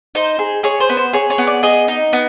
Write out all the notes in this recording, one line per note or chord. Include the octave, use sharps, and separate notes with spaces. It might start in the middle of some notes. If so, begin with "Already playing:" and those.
D#4 C5
G#4
G#4 C#5
C5
B3
C5
G#4 C#5
C#5
B3
D5
G#4 D#5
D#4
B3